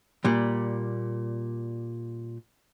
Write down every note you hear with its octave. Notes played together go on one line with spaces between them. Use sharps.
A#2 G3